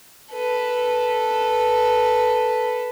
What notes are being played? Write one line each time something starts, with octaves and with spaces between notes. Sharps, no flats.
A4 B4